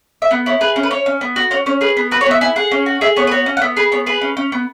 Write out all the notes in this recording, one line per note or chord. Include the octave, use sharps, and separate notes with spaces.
E5
B3 F#5
E4 C#5
G#4 B4
C#4
B4
C#4 C#5
C#4
B3
F#4
C#4 C#5
C#4 C#5
G#4 B4
B3
F#4 B4
C#5
B3 E5
E4 G#5
G#4 F#5
C#4
F#4
G#4 E5
B3 C#5
B4
F#4 C#5
C#4
F#5
B3 E5
G#4 B4
B3 C#5
G#4 B4
C#4
C#4
B3